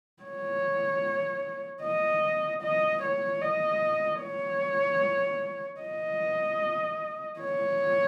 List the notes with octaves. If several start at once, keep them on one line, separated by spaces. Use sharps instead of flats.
C#5
D#5
D#5
C#5
D#5
C#5
D#5
C#5